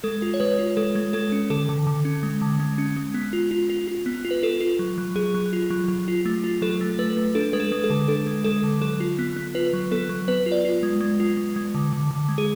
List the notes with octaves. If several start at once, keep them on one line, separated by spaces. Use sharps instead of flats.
G#3 A4
F4
C#5
G#3 B4
F4
G#3 A4
G#3
G#3 A4
C#4
D3 A4
D3
D3
C#4
G#3
D3
G#3
C#4
G#3
B3
F4
F4
F4
F4
B3
F4
B4
F4 A4
F4
F#3
F#3
F#3 G#4
F#3
F4
F#3
F#3
F4
A3
F4
F#3 A4
A3
A3 B4
A3
D4 A4
G#3 B4
A4
G#3
A4
D3
D4 A4
G#3
G#3 A4
D3
F#3 A4
F4
B3
B3
F4 B4
F#3
B3 A4
F#3
B3 B4
F4
D5
F4
G#3
G#3
F4
G#3
G#3
D3
D3
D3
G#3
G#4